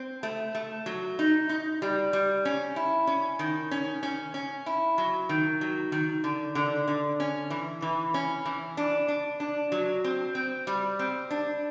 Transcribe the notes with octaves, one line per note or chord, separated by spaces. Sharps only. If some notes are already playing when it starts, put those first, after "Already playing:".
Already playing: C4
A3
A3
F#3
D#4
D#4
G3
G3
C#4
E4
C#4
D#3
C#4
C#4
C#4
E4
F#3
D#3
F#3
D#3
D3
D3
D3
C#4
E3
E3
C#4
E3
D4
D4
D4
F#3
C4
C4
G3
C4
D4